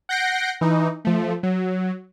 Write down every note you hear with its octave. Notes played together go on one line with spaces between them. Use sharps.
F#5 G6 A#6 C7 D7
E3 D#4
F3 A3
F#3